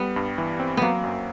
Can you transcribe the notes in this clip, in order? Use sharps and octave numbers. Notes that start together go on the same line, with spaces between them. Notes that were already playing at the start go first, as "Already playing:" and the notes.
Already playing: G3 B3
G2
E3
C4
F#3 A#3 B3
F#2